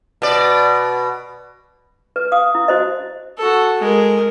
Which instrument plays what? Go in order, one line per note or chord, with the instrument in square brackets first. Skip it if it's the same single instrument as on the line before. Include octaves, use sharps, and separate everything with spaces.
[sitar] B2 D5
[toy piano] B4
F5 D#6
E4
F#4 C5 D#5
[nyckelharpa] F#4 A4
G#3 A#4